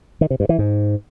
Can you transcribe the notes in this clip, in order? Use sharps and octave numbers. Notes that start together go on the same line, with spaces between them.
D#3
C3
G2
E3
G#2